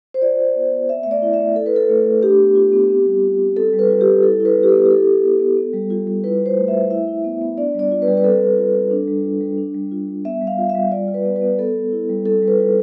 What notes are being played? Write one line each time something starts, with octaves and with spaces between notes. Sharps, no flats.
C5
F4 D5
F4
B3
B3
C4 E5
A3 E5
D5
E4
E5
A3
E4 A4
B4
E4 A4
A3
A3
D4 G4
B3
F4
B3
C4
G3
F4
G3
C4 A4
G3
B4
F4
G4
G3
E4 A4
E4
B4
B3
G4
B3 A4
G4
E4 A4
E4
B3
B3
B3
G3
F4
G3
E4 B4
E4
C5
A3
E5
A3
E4 E5
E4
B3
B3
D4 D5
G3 D5
F4
B4
G3
B4
C4 A4
G3
F4
G3
D4
G3
F4
G3
D4
G3
F4
G3
B3 E5
G3
F5
F4
E5
G3
F4 D5
F4
B4
B3
B4
B3
B3 A4
G3
E4
G3
C4 A4
G3
B4
F4